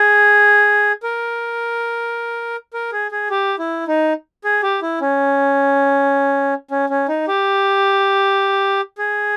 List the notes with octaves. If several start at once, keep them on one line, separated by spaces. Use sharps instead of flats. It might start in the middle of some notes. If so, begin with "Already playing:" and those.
Already playing: G#4
A#4
A#4
G#4
G#4
G4
E4
D#4
G#4
G4
E4
C#4
C#4
C#4
D#4
G4
G#4